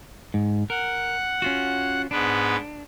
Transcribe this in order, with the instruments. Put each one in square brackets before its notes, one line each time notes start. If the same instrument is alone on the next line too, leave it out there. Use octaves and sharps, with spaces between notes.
[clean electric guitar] G#2
[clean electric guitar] A#4 [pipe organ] F#5
[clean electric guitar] C#4 F4 F#4
[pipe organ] G#2 B3 B4 [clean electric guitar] D4